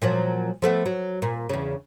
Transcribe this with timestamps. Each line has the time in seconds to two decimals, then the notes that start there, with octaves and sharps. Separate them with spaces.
0.02 A#2 F3 F#3
0.62 F3 A3 B3
0.86 F#3
1.22 A#2
1.49 E2 C#3